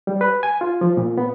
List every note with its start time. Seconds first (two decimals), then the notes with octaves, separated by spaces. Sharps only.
0.07 G3
0.21 B4
0.43 G#5
0.61 F4
0.81 F3
0.97 A#2
1.18 B3